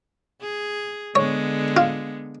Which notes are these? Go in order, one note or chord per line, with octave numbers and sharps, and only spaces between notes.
G#4
D3 G#3 B3 C#5
F4